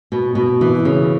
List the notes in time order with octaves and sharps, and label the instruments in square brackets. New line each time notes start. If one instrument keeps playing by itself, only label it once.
[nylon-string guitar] B2
B2
E3
C#3